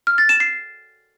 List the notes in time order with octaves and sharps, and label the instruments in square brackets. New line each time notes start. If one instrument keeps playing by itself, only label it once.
[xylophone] F6
A6
E7
C7